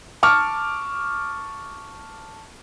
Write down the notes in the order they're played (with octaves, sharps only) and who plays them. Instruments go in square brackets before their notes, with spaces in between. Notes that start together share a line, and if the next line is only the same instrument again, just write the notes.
[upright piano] A5 C#6 D6 F6